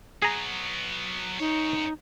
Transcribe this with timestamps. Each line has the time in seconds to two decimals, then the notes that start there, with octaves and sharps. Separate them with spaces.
0.22 F#3 B3 G#4 A#5
1.40 F#2 D#4 C#5